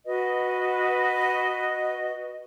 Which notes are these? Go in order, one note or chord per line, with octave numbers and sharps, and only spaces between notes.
F#4 B4 D#5